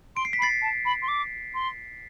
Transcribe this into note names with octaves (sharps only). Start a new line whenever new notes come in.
C6 D7
C7
B6
B5
A6 C7
A5
B5
C6
D6
C6